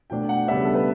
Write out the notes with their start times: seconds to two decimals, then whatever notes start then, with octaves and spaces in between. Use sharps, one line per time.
0.10 B2 A3 D4 G5
0.29 F#5
0.48 C#3 G3 B3 D4 E5
0.65 A4
0.75 B4